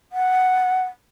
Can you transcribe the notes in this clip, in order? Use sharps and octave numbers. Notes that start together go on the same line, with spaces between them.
F#5